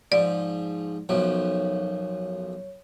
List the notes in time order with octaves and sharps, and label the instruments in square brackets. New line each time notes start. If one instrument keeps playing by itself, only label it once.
[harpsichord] G#2 F3 [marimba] D5
[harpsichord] B1 F#2 F3 [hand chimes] C#5